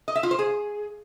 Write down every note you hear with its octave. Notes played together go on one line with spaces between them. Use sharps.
D#5
E5
F4
C5
G#4